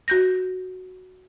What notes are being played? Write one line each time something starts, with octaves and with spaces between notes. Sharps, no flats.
F#4 G6 A#6